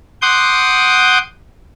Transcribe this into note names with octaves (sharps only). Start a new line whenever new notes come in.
F#5 C6 D6 D#6 G6